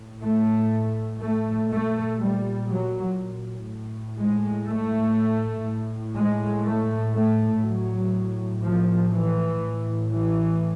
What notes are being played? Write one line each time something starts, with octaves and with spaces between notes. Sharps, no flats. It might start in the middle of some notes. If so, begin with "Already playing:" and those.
Already playing: A2
A3
A3
A#2 A3
G3
F#3
A2
G#3
A3
A2
G#3
A3
A3
A2 F#3
F3
E3
A2
E3